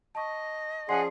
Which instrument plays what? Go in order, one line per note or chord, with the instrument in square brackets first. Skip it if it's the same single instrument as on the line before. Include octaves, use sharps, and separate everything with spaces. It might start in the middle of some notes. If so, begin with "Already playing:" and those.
[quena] D#5 [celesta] A5 C#6
[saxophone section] F3 C#4 G#4 [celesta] D5 C6 C7 [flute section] F#5 G#5